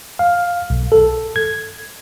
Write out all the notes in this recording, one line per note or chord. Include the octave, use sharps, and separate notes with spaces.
F5
B1
A4
G#6